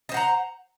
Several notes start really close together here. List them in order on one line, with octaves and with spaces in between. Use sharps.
D#5 C5 F#5 A#5